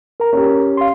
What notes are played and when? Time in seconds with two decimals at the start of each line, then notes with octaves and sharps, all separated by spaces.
0.20 A#4 A#5
0.33 C#4 G4
0.77 F5 C6